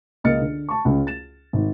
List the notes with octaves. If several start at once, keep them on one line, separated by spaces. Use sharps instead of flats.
C#2 A#3 D#5 F6 A6 C#7
D3
A5 C#6
C#2 C#4
A6 E7
G#1